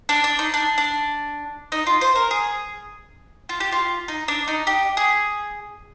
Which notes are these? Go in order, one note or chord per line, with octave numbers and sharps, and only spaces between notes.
D4
D4
D#4
D4
D4
D#4
F4
C5
A#4
G#4
F4
G4
F4
D#4
D4
D#4
G4
G#4